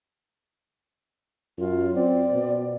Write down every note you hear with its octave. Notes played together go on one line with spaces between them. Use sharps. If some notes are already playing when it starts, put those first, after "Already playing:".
F#2 F4
C4 D5
B2